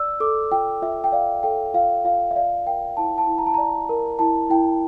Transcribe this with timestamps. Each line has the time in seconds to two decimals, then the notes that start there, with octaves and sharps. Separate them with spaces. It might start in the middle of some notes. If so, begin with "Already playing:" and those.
Already playing: D5 E6
0.20 A4 D6
0.51 F4 G5
0.82 F4 E5
1.04 G5
1.12 D5 F5
1.43 A4 G5
1.74 F4 F5
2.05 F4 F5
2.31 E5
2.36 D5 F5
2.66 A#4 G5
2.97 E4 A5
3.18 A5
3.27 E4
3.38 A#5
3.46 A5
3.54 D5 A#5
3.89 A#4
4.19 E4 A5
4.50 E4 G5